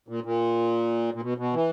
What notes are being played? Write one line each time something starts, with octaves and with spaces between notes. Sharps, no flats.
A#2
A#2
A#2
B2
B2
E3